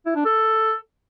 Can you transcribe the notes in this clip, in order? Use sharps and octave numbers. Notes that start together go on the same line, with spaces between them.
E4
D4
A4